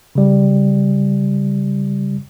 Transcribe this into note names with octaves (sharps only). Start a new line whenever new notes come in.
C#3 G3